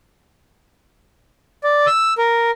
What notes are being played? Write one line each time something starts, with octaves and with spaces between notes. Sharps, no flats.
D5
E6
A#4